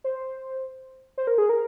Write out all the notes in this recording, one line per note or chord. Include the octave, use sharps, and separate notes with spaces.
C5
C5
A#4
G#4
A#4